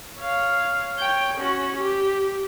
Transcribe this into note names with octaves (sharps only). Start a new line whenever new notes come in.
C#5 F5
C#5 G5
C#4 F#4
G4